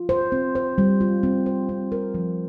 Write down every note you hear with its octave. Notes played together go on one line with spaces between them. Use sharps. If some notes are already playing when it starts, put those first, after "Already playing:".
Already playing: F4
C5
C4
C5
G3
F4
C4
C5
C4
A#4
F3